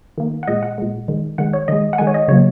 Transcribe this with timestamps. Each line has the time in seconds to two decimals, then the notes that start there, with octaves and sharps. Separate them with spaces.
0.18 D#3 A#3
0.43 F#5
0.48 A#2 G#3 D#5
0.63 F#5
0.78 A#2 G#3
1.08 D#3 G#3
1.38 D#3 G#3 F#5
1.53 C#5
1.68 D#3 G#3 D#5
1.93 F#5
1.98 D#3 G#3 G#5
2.07 C#5
2.14 D#5
2.28 C#3 F#3 A#3 C#5